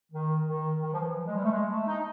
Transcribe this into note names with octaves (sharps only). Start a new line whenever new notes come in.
D#3
D#3
D#3
F3
E3
F3
G#3
G3
A3
G#3
A3
D#4